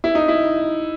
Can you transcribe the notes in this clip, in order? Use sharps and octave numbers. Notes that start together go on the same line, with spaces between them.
E4
D#4
E4